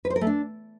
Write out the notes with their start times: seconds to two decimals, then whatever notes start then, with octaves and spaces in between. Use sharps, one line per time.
0.05 B4
0.10 C5
0.16 A#4
0.21 A3
0.27 D4